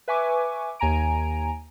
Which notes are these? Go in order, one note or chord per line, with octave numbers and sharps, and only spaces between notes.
B4 E5 G#5 C#6 D6
D#2 G#5 A#5 D7